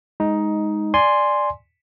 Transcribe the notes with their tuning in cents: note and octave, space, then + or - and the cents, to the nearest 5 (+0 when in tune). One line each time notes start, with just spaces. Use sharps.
G#3 +0 D#4 +10
D5 +5 G#5 +0 C6 +0